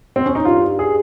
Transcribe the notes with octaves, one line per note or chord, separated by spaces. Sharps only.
C4
C#4
D#4
G2 G3 F4
G#4